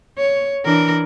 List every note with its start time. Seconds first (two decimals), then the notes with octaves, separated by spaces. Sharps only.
0.18 C#5
0.65 E3 D4 A#4